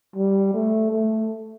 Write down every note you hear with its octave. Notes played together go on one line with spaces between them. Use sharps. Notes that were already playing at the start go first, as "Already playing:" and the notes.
G3
A3
A3